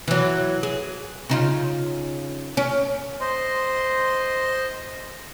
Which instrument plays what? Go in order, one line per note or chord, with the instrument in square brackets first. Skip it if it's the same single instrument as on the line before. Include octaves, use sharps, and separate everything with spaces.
[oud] E3 F#3
G#4
C#3 D#4 F4
C#4
[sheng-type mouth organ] C5 D#5 C6